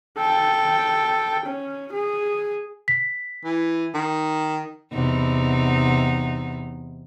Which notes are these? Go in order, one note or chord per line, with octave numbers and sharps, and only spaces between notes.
A4 G5
C#4
G#4
B6
E3
D#3
E2 C3 D#4